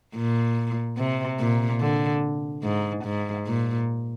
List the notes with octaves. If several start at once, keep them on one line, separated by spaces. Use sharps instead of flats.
A#2
C3
A#2
D3
G#2
G#2
A#2